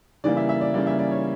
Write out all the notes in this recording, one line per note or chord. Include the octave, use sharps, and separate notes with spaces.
C#3 E3 G3 A#3 D5
E5
E5
D5
C#3 E3 G3 A#3 D5
E5
D5
C#5